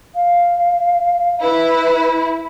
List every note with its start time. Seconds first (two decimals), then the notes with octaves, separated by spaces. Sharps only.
0.15 F5
1.41 E4 B4